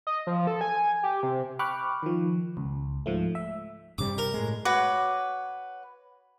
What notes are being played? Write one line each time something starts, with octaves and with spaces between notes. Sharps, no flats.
D#5
F3
A4
G#5
G4
C3
G5 B5 C#6 D6 F6 F#6
D#3 F3
C#2
G#2 F3 A3
E5
G2 C3 G3 D6
A#4
A2 G#3
F#4 B4 C#5 D6